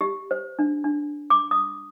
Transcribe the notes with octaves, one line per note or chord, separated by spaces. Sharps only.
G4
C5
D4
D4
D6
D#6